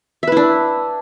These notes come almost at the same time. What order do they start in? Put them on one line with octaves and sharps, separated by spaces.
E5 B4 E4 D4